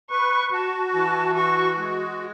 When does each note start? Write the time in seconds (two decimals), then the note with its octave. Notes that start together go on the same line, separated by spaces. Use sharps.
0.10 B4 C#6
0.52 F#4 A5
0.94 E3 A5
1.35 F#4 C#6
1.78 G#3